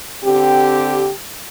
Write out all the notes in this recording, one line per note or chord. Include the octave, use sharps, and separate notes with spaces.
D3 C4 G4